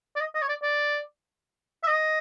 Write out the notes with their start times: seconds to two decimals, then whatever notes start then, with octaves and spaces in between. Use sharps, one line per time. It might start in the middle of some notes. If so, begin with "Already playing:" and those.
0.15 D5
0.20 D#5
0.34 D#5
0.42 C#5
0.49 D5
0.62 D5
1.83 E5
1.87 D#5